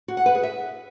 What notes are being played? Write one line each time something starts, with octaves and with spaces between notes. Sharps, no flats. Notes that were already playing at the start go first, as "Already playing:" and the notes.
F#4
F#5
B4
G#4
E5